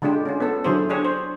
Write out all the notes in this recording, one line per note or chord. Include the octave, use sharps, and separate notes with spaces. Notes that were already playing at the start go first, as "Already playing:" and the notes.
D3 G#3 D4 F4 G4
C#4 F4
B3 A4
D3 F#3 E4 G#4 C5
D4 G4 G#4 C#5
C5